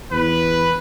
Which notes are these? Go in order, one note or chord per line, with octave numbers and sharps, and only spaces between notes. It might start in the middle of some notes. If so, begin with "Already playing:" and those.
E2 B4